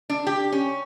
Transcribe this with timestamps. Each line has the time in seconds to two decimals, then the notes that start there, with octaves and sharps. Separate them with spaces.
0.10 D4
0.27 G4
0.52 C#4